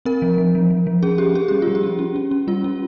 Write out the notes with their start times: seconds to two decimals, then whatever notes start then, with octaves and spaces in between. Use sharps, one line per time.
0.05 C4 A#4
0.22 F3
0.38 F3
0.55 F3
0.70 F3
0.87 F3
1.03 C#4 G#4
1.18 C#4 G4
1.35 C#4 G#4
1.48 G3 G4
1.62 G3 F4
1.75 G4
1.83 C#4
1.99 C#4
2.16 C#4
2.31 C#4
2.47 G3 F4
2.64 C#4